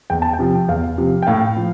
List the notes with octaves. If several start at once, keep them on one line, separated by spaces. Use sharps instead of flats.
E2 G5
A5
G5
C3 F3
E2 F5
C3 F3
G5
A2 F5
F3